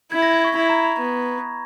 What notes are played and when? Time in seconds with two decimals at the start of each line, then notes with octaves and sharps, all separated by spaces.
0.12 E4 G#6
0.22 A#6
0.33 G#6
0.45 C#6
0.55 E4 B5
0.70 A#5
0.85 B5
0.99 B3